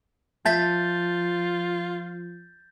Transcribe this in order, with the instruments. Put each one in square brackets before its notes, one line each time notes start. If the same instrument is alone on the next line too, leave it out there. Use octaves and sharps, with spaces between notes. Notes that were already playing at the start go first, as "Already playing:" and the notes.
[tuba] F3 [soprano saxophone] F4 [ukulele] E5 A5 [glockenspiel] G6 A6 B6